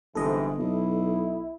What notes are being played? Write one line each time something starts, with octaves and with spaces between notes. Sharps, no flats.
G1 G#2 C3 E3 A4 D#5
B1 E4